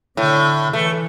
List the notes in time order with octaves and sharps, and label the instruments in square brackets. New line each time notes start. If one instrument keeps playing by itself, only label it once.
[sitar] A2 [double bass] D3
[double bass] E3 [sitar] A3